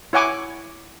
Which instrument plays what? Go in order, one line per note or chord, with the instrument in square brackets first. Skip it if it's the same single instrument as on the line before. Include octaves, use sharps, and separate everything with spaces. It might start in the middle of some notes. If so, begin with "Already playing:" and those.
[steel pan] E4 C#5 F#5 G#5 D6